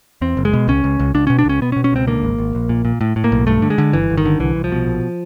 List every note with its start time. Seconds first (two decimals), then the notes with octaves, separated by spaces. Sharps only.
0.21 E2 C4
0.37 F#1
0.45 G#3
0.53 B2
0.68 C#2 C#4
0.84 C#2
0.99 C#2
1.14 C#2 D4
1.27 B2 C#4
1.39 D4
1.45 C#2 C#4
1.62 B2 B3
1.72 C#4
1.76 B2
1.84 C#4
1.93 C#2 C4
2.07 D3 A#3
2.23 G#1
2.38 G#1
2.55 A#1
2.69 A#2
2.85 A#2
3.01 A2
3.16 A2
3.24 A#3
3.32 B1
3.47 G2 A3
3.62 D3
3.70 G#3
3.78 D3
3.93 G1 E3
4.10 G1
4.17 D#3
4.25 D3
4.40 C2 E3
4.55 C2
4.64 F3
4.72 B2
4.86 A#1